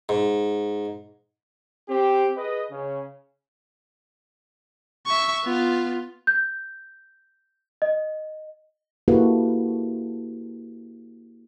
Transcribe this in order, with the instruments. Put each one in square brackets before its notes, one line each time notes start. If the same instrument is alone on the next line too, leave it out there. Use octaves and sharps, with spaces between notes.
[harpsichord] G#2
[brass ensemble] C4 G4
G#4 B4 D#5
C#3 C#4
[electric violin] E5 C#6
B3 F4
[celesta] G6
D#5
[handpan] A#3 E4 F#4 G4 A4 B4